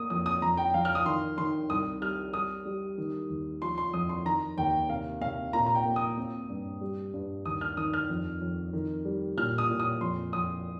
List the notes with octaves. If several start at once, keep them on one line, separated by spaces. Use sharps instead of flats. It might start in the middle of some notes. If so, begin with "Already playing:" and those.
Already playing: A#3 D#6
F2 D#6
D#6
F2 A#5
G5
F2 F5
F6
D#6
D#3 C6
D#3 C6
C2 D#6
G3 F6
G3 D#6
G3
D#3
D#2
F3 C6
C6
F2 D#6
C6
D#3 A#5
D#2 G5
C3 F5
C3 F5
A#2 A#5
A#5
G5
A#3
D#6
C4
G2
G3
G2
D#2 D#6
F6
D#3 D#6
F6
F2
F2
D#3
G3
A#2 F6
D#6
A#2
D#6
F2 C6
F2 D#6